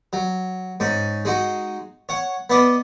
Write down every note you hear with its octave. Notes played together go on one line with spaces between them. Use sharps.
F#3
G#2 C#4
G#3 D#4 F#4
C#5 F#5
B3 B4 D5 D#5